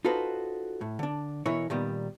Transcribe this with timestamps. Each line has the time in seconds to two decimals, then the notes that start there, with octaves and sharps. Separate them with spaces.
0.05 D#4 F4 F#4 A4 B4 C5
0.81 A2
0.99 D3 D4
1.46 B2 E3 E4 A#4 C#5
1.70 A#2 D#3 G3 B3